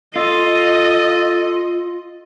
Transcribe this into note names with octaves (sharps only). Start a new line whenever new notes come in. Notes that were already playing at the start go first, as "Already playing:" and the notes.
F4 A4 D#5